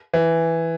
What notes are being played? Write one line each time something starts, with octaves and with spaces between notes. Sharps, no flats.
E3